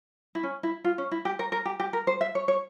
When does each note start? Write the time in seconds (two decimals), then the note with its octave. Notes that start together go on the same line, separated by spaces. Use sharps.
0.35 E4
0.43 C#4
0.63 E4
0.84 F4
0.98 C#4
1.11 E4
1.25 G4
1.39 A#4
1.52 A#4
1.66 G4
1.80 G4
1.93 A#4
2.07 C5
2.21 E5
2.35 C#5
2.48 C#5